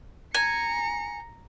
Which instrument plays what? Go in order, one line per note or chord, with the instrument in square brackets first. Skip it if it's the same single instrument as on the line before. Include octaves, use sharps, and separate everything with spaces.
[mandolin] G#5 [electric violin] A#5 C#7